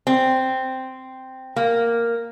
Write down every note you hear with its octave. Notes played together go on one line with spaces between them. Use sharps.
C4
A#3